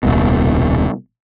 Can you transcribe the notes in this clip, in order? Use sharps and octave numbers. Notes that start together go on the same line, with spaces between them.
D#1 C2 B2